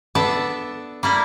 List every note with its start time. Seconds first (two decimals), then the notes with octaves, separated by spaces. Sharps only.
0.15 B3 D4 A4 E5 A5
1.03 G3 A#3 E4